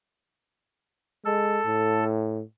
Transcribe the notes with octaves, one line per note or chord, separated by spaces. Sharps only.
G#3 A4
A2